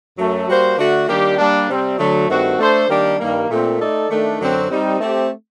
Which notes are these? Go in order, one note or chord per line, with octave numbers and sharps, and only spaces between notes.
F#2 F#3 A3
G3 A#3 F#4 C5
D3 A3 D4 F#4
D#3 G3 A#3 D4 G4
G3 A#3 D4
C3 G3 C4
D3 F#3 A3
G2 D#3 A3 C4 F#4
A3 D4 A4 C5
D#3 G3 A#3 D4 G4
G2 D#3 G3 A#3
A#2 A3 C4
A3 D#4 A4 D5
D#3 A3 D4
F#2 D3 F#3 C4 F#4
G3 C4 D#4
A3 C4 G4